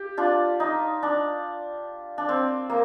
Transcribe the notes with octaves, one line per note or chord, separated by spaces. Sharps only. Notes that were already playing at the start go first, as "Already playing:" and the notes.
Already playing: G4
D4 F4
D#4
D4
D4
C4
A#3